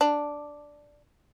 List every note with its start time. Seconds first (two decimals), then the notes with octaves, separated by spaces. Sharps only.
0.01 D4